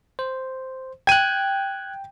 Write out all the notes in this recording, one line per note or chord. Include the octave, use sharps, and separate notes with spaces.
C5
G5 F#6 G#6 D#7